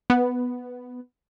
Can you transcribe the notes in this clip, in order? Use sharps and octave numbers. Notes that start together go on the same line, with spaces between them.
B3